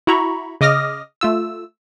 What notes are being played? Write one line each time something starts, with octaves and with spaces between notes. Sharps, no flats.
E4 F#4 A#5 B5 C#6
C#3 D#5 D6 D#6 F6 A#6
A3 F4 E6